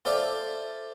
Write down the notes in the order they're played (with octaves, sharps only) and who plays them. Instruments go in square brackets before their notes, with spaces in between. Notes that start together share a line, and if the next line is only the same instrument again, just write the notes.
[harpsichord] F4 A4 C5 D5 E5